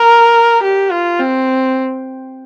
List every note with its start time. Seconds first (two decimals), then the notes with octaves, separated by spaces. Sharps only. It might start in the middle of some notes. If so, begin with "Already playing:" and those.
Already playing: A#4
0.63 G4
0.91 F4
1.20 C4